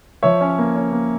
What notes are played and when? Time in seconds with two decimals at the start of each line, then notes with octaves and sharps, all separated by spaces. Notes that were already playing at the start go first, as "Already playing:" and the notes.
0.23 F3 C#5 E5
0.41 C#4
0.59 A#3
0.75 C#4
0.92 A#3